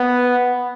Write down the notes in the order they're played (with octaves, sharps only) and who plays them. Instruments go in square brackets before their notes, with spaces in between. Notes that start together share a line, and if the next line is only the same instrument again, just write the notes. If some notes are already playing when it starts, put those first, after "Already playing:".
Already playing: [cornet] B3